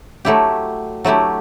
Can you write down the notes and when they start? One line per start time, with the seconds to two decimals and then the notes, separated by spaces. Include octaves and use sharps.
0.25 F#3 A3 E4 G4
1.05 F#3 A3 E4 G4